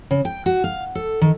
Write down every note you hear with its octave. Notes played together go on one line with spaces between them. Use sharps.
C#3
G5
F#4
F5
A4
D#3